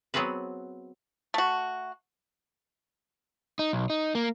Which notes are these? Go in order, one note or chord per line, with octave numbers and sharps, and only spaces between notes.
F#3 B3 C4 G#4 B4
A3 F#4
D#4
B1
D#4
A#3